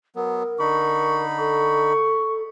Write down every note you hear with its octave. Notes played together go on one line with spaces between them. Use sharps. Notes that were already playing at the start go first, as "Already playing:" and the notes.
F#3 B3 A#4
D3 D#4 B5 C#6
A4 C#6